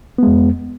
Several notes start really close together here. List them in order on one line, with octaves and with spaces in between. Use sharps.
B3 G#3 F2